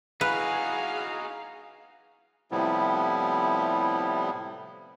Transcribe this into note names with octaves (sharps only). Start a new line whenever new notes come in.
D#4 E4 F#4 G#4 B4 F5 G#5
A2 C3 F3 G3 B3 E4